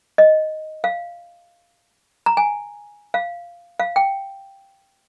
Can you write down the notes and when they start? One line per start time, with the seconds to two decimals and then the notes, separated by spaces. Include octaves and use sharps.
0.18 D#5
0.84 F5
2.26 A#5
2.37 G#5
3.14 F5
3.79 F5
3.96 G5